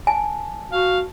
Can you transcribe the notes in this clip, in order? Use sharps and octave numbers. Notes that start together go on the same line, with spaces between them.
G#5 A5
F#4 F5